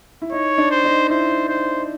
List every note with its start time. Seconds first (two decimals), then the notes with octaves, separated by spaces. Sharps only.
0.22 E4
0.32 D#4 C#5
0.58 D4
0.71 C5
0.84 D#4
1.09 E4 C5
1.49 C5